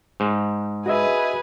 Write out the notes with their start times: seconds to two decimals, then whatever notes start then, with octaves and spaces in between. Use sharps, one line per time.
0.20 G#2
0.86 F#4 G#4 B4 D#5 E5